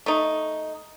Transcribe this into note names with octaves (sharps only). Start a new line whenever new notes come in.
A3 D#4